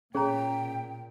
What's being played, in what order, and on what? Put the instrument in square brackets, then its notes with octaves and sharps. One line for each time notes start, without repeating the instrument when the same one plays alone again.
[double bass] A#2 [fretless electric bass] C#4 [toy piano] G#4 C#5 A#5 [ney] G5